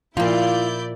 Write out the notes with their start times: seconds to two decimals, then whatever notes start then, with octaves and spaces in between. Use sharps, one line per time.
0.17 A#2 F3 E4 F4 D5 G6